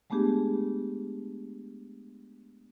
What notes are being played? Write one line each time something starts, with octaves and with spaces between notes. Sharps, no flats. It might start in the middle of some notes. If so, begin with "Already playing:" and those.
G#3 A3 B3 D4 G4 G#4